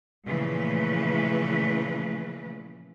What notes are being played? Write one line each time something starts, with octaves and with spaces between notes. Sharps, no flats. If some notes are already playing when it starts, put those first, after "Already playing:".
A#2 C#3 E3 F3 A3 B4